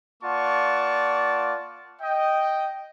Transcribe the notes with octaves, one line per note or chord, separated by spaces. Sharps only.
A#3 F4 D5 F#5 A5 C#6
D#5 G5